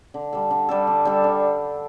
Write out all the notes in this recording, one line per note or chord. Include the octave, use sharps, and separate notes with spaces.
D3
G3 D4 A4
D3
G3 D4 A4
D3
G3 D4 A4
D3